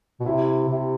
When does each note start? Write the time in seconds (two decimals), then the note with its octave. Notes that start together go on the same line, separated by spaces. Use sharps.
0.20 B2
0.26 C3 E4
0.68 C3 E4